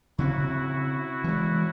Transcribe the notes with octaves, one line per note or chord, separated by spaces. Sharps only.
C#3 C4 E4 F#4
E3 G#3